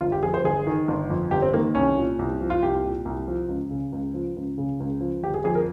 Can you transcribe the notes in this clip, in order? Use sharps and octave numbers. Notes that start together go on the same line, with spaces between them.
G1 F4
G4
F2 G#4
C5
G1 G#4
D#3
G1
F2
G1 G4
C4
D#3 A#3
C2 C#4
A#2
C2
F3
F4
C2 G4
A#2
C2
F3
C#2
C#3
C#2
F3
C#2
C#3
C#2
F3
G1 G4
G#4
F2 G#4
A#4